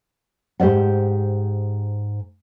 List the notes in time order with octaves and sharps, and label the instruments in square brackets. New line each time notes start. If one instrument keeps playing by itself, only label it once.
[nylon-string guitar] G#2 G4 C5 D5 F#5